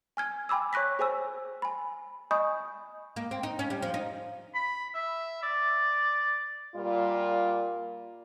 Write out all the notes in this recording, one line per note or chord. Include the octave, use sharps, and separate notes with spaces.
G#5 F6 G#6
G5 G#5 B5 D6 E6
C#5 C#6 F#6 A#6 B6
G#4 C5 G#5 E6
G#5 B5
D#5 G#5 B5 C#6 D#6 G6
A#3
C4
D#4
C#4
G3
F3
D#4
B5
E5
D5
A#2 G3 F4